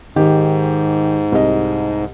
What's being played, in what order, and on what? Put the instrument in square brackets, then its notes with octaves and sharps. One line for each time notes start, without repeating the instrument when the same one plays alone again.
[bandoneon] G#2 [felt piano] D#3 G4
[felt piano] C2 D#5